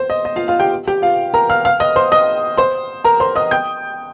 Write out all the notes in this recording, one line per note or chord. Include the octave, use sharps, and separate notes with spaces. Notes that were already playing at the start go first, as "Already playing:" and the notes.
Already playing: C5
D#5
D#5
F4 F5
F4 F5
G4 G5
G4 G5
F4 F5
A#4 A#5
F5 F6
F5 F6
D#5 D#6
C5 C6
D#5 D#6
C5 C6
A#4 A#5
C5 C6
D#5 D#6
G5 G6